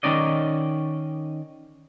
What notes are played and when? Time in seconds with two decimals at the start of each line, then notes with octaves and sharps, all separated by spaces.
0.03 D#3 C#4 D#4 D5 D#5